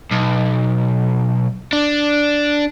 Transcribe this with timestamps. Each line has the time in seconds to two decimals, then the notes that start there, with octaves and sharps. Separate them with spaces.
0.11 B1
1.73 D4